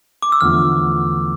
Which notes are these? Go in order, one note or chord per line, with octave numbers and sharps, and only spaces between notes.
D6
E6
E2 D3 F3 A3 F6